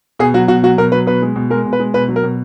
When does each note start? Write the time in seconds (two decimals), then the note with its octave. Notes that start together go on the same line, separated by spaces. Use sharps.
0.19 B2 G#4
0.34 F#3 F#4
0.48 B2 F#4
0.63 F#3 F#4
0.78 B2 A#4
0.92 F#3 B4
1.07 B2 B4
1.22 G#3
1.36 B2
1.50 G#3 A#4
1.65 B2
1.73 B4
1.80 G#3
1.94 B2 B4
2.08 F#3
2.16 A#4
2.24 B2